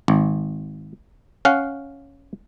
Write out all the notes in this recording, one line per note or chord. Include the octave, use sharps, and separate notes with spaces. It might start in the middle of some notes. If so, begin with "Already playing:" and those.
G#1
C#4 F5 F#5